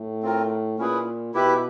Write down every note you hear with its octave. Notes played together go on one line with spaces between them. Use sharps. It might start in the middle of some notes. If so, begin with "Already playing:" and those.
Already playing: A2
C4 F4 A#4
A#2 C#4 E4 G#4 B4
B2 E4 G4 B4 E5